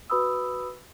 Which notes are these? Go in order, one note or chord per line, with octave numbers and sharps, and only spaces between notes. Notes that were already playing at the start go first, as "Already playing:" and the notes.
F#4 B4 B5 D#6 E6